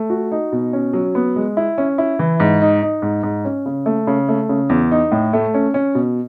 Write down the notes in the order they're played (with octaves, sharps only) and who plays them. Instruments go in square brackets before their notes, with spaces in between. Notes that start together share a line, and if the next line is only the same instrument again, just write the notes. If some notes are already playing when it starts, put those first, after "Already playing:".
Already playing: [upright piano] A3
F#4
D#4
B2
C#4
F#3
B3
G#3
E4
C#4
E4
E3
G#2
D#4
D#4
G#2
G#2
C#4
C#3
A3
C#3
A3
C#3
E2
D#4
A2
A3
C#4
C#4
B2